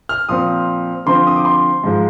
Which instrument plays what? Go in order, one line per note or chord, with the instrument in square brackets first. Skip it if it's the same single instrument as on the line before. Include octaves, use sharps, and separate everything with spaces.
[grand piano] F6
A#2 F3 C4 D#6
D3 F3 C4 C6
D#6
D6
C6
G#2 F3 G#3